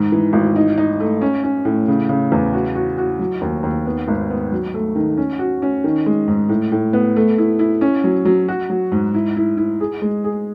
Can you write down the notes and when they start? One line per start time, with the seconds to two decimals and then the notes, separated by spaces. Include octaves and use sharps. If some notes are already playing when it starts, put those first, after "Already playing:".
Already playing: G#2 D#3
0.12 E3
0.33 G#1
0.56 D#4
0.78 D#4
1.00 A3
1.21 C#4
1.44 C#4
1.65 A2
1.88 C#3
2.09 C#3
2.32 E2
2.53 F#4
2.75 F#4
2.98 F#4
3.19 F#3
3.41 D#2
3.63 D#2
3.86 B3
4.08 G#1
4.30 B3
4.52 F#3
4.74 A3
4.95 D#3
5.17 C#4
5.39 F#4
5.62 C#4
5.84 D#3
6.06 G#3
6.28 G#2
6.49 A2
6.72 A2
6.93 B3
7.16 A3
7.38 E4
7.59 E4
7.81 C#4
8.04 F#3
8.25 F#3
8.48 F#4
8.70 F#3
8.92 G#2
9.14 E4
9.36 E4
9.57 E4
9.80 G#4
10.02 G#3
10.24 G#4